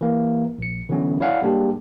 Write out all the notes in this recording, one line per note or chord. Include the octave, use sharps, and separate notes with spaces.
E3 A#3
A#1 C#7
D3 E3 F#3 B3 C#4
E4 C#5 D5 F5 F#5 G#5
G3 G#3 A#3 D4 G4 G#4